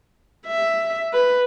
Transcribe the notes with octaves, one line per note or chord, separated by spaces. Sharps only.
E5
B4